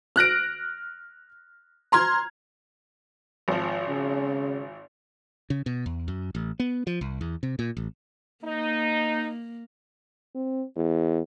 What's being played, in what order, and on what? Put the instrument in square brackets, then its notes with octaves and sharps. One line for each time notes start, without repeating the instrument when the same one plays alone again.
[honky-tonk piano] F6 F#6 A#6 D7
A#5 C6 F6 G#6
[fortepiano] G#1 F3
[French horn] C#3
[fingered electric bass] C#3
B2
E2
F#2
A1
B3
F3
C2
E2
C3
A#2
A1
[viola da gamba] A#3 [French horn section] D#4
[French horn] C4
E2